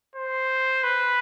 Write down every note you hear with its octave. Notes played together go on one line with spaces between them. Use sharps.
C5
B4